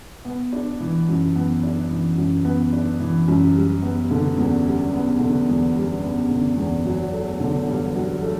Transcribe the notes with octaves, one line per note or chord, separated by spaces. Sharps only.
B3
D4
E3
F#2
B3
D4
E3
F#2
B3
D4
E3
F#2
G3
B3
D3
E2
G3
B3
D3
E2
G3
B3
D3
E2
F#3
A3
D3
G2
F#3
A3